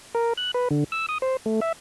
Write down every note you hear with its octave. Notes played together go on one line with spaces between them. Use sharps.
A#4
F#6
B4
D3
E6
D#6
C5
A3
E5